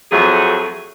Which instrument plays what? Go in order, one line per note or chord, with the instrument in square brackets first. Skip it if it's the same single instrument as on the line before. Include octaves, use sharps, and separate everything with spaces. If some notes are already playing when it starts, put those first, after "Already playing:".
[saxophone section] F2 F#3 A3 G#4